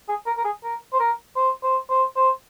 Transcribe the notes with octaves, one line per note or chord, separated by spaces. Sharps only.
G#4
A#4
A#4
G#4
A#4
C5
A#4
C5
C5
C5
C5